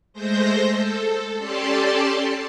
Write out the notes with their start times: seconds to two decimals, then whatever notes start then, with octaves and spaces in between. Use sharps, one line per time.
0.13 G#3 A3 C5 G6 A#6
0.66 A4
1.38 C#4 G4 A4 D5 A5 C6